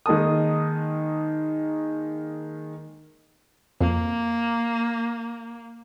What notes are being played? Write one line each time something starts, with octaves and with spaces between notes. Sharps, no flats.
D#3 G#3 A#3 A5 D#6
F2 A#3